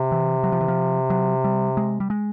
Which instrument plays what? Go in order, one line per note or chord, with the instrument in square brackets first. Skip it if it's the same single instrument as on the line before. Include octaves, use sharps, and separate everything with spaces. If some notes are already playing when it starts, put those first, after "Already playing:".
Already playing: [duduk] C3
[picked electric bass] E3
F#3
F3
E3
F3
F#3
G3
G#3
G3
G#3